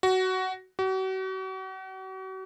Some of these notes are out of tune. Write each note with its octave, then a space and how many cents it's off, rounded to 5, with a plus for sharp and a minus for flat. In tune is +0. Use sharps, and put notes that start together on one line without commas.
F#4 +15
F#4 +40